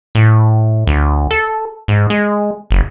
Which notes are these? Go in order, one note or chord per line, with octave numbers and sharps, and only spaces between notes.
A2
D2
A4
G#2
G#3
F#1